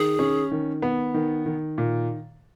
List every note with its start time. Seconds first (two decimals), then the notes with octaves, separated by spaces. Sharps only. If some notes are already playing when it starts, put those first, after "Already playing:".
Already playing: D#3 G#4
0.19 C#4
0.51 D#3
0.82 B3
1.14 D#3
1.46 D#3
1.78 A#2